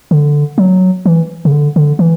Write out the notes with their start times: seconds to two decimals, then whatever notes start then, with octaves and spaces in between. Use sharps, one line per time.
0.11 D3
0.58 F#3
1.06 E3
1.45 C#3
1.52 D3
1.76 D3
1.99 E3